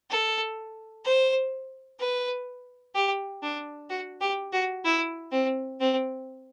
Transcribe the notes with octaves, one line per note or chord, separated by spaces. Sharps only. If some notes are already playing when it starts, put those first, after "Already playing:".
A4
C5
B4
G4
D4
F#4
G4
F#4
E4
C4
C4